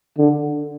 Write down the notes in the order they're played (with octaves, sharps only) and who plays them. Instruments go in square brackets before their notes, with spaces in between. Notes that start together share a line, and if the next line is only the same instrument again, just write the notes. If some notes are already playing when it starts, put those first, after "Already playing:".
[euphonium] D3